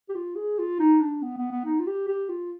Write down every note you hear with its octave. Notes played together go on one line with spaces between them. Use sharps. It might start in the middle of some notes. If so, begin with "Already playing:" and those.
G4
F4
G#4
F4
D#4
D4
B3
B3
B3
D#4
F4
G4
G4
F4